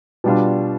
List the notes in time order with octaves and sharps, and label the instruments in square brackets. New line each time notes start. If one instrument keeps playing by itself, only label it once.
[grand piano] B2 G3 D4 F4